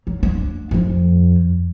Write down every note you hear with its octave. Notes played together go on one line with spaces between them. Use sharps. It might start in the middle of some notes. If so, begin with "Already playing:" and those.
F#3
D4
F2 F3